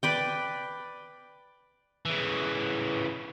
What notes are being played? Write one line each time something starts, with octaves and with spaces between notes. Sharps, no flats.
B4 D5 G5
C#3 E3